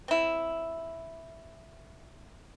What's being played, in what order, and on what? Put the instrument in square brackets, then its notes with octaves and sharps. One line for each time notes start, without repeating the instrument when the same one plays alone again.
[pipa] C4 E4